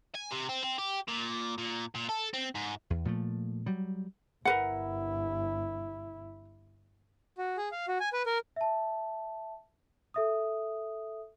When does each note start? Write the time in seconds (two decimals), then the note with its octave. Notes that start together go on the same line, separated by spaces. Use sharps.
0.15 G#5
0.31 C3
0.49 C4
0.64 C4
0.78 G4
1.08 A#2
1.58 A#2
1.95 A#2
2.09 A4
2.34 C4
2.55 G#2
2.90 E2
3.05 A#2 F3 G3 A3
3.66 F#3 G3
4.45 G1 E4 A#4 B4 F#5
7.38 F#4
7.57 G#4
7.72 F5
7.88 F#4
8.00 G#5
8.13 B4
8.26 A#4
8.56 E5 A5
10.14 A4 E5 D#6